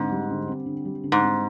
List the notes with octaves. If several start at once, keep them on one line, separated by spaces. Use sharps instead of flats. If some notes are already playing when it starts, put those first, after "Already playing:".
Already playing: G#2 D3 C4
G3
D3
C4
D3
G3
D3
G#2
C4